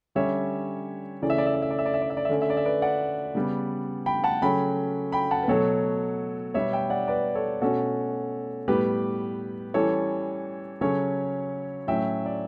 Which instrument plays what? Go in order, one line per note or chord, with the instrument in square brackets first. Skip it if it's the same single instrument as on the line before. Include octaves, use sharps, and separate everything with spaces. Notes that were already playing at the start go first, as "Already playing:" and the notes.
[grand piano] D3 G3 C#4 C#5 E5
C#3 E3 A3 C#4 D5
E5
D5
E5
D5
E5
D5
E5
D5
E5
D5
E5
D5
E5
D3 A3 C#4 D5
E5
D5
E5
B4 D5
D5 F#5
C#3 G3 B3
G5 B5
F#5 A5
C#3 F#3 A3 C#4 G5 B5
G5 B5
F#5 A5
B4
B2 F#3 A3 A4 C#5
B2 G3 B3 C#5 E5
E5 G5
D5 F#5
B4 D5
A4 C#5
B2 A3 C#4 F#4 A4
A2 G3 B3 G4 B4
E3 G3 C#4 A4 C#5
C#3 F#3 C#4 A4 C#5
A2 F#3 C#4 E5 G5
D5